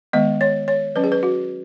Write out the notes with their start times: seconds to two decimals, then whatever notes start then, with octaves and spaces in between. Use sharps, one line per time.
0.13 D#3 G#3 B3 D#5
0.41 C#5
0.68 C#5
0.95 F#3 C#4 B4
1.04 G#4
1.12 B4
1.23 F#4